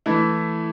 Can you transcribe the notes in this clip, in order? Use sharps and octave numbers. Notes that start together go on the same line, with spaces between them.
E3 A3 E4